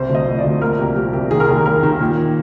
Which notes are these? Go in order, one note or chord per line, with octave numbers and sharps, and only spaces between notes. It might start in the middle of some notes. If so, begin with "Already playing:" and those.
Already playing: C2 C3 C5
D2
D#5
F3
D5
D2
A#2 A#4
C2 G4
F3 G4
C2 G4
D#3 G#4
A#4
D#2 G#4
D#2 A#4
D#3
A#2